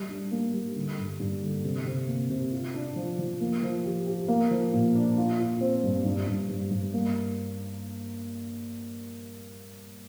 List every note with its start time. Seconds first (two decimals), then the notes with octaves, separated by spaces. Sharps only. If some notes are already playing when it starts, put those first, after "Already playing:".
Already playing: G3
0.09 D4
0.32 A#3
0.54 G3
0.76 D3
0.98 G2
1.20 G2
1.43 D3
1.64 C3
1.86 C3
2.07 A#3
2.30 C3
2.52 F4
2.74 D4
2.96 F3
3.19 F3
3.41 A#3
3.63 F3
3.85 G4
4.06 G4
4.28 A#3
4.51 F3
4.73 A#2
4.95 D4
5.17 F4
5.39 F4
5.61 C4
5.84 G2
6.05 G2
6.27 G2
6.49 G2
6.71 G2
6.94 A#3